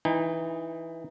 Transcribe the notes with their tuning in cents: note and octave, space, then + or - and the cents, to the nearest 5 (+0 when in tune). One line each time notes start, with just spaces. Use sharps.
E3 +0 D#4 +0 G#5 -45